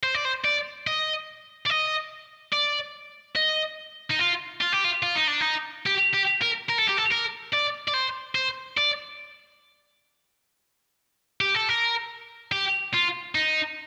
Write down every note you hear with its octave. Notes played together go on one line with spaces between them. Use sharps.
C5
D5
C5
D5
D#5
D5
D#5
D5
D#5
D#4
F4
F4
G4
F4
F4
D#4
D4
D#4
G4
G4
A#4
A#4
A4
G4
A4
A#4
D5
D5
C5
C5
D5
G4
A4
A#4
G4
F4
D#4